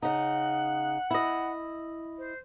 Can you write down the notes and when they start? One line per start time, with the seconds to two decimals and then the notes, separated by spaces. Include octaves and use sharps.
0.02 C#3 D#4 F#5
1.11 E4 D#5
2.18 C5